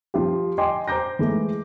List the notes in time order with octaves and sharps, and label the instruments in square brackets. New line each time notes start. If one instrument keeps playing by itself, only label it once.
[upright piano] F3 F4 G4
D#5 G5 G#5 C6 D6
C5 A#5 D6 G6 A#6
E3 G#3 A3